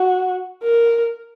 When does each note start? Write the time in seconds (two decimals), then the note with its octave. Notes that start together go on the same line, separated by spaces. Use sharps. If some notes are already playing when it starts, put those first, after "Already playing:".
Already playing: F#4
0.63 A#4